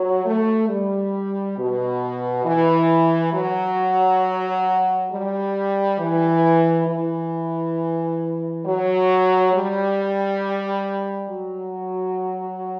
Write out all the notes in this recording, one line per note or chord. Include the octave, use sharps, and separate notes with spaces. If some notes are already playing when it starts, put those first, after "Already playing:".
Already playing: F#3
A3
G3
B2
E3
F#3
G3
E3
E3
F#3
G3
F#3